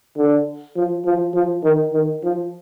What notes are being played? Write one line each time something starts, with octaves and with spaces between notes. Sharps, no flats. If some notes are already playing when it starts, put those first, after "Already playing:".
D3
F3
F3
F3
D#3
D#3
F3